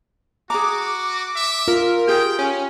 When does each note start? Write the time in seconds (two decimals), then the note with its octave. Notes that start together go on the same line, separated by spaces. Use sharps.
0.50 F#4 G#4 A#5 D6
1.36 E5
1.68 F4 A#4
2.08 G4 G#4 G5
2.39 C#4